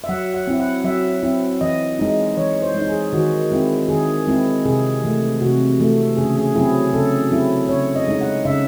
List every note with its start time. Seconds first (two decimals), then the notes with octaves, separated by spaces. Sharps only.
0.04 E5
0.09 F#3 F#5
0.34 F#5
0.47 C4 E4
0.60 F#5
0.85 F#3 E5
1.23 C4 E4
1.61 E3 D#5
1.99 G#3 D#4
2.37 E3 C#5
2.62 C5
2.75 G#3 D#4
2.87 G#4
3.13 D#3 F#4
3.51 G#3 C4 E4
3.89 D#3 G#4
4.27 G#3 C4 E4
4.65 C3 G#4
5.03 E3 A3
5.41 C3 F#4
5.79 E3 A3
6.17 C#3 G#4
6.37 G#4
6.56 F#3 C4 E4 G#4
6.93 C#3 A4
7.32 F#3 C4 E4
7.69 C#3 C#5
7.95 D#5
8.08 G#3 D#4
8.21 F#5
8.45 C#3 E5